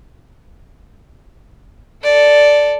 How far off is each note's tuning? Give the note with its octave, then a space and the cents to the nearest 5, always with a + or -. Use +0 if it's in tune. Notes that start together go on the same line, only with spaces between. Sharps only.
A4 +0 D5 +0